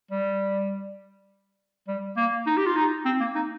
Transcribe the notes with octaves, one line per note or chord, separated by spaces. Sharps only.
G3
G3
A#3
D#4
G4
F4
D#4
C4
A#3
D#4